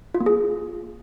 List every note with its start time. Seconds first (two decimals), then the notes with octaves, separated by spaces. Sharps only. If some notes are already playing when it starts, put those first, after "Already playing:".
0.14 F4
0.20 A#3
0.26 G#4